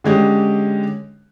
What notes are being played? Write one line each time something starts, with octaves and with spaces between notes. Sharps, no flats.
D3 G#3 C#4 G4